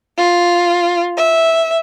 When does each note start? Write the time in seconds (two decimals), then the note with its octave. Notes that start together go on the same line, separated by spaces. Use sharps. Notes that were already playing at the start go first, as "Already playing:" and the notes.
0.16 F4
1.16 E5